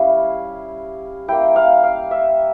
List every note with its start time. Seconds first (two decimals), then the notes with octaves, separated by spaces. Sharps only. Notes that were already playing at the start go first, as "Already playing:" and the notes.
Already playing: G3 C#4 E4 F5
1.28 A#3 E4 G5
1.56 F5
1.83 F5
2.11 E5